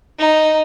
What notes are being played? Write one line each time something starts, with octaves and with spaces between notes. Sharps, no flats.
D#4